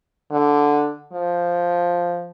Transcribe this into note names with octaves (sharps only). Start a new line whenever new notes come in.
D3
F3